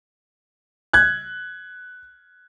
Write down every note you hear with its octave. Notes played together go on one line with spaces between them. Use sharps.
F#6 G#6